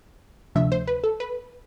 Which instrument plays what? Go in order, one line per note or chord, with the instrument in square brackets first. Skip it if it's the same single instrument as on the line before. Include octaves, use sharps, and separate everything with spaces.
[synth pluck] D2 C3 F3 A3 D4 E5
C5
B4
A4
B4